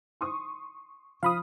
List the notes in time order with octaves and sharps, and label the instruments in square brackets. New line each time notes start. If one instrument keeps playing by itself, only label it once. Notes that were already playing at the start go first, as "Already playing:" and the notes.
[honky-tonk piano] C6 C#6 D#6
[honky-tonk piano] F3 [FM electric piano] F5 B5 D#6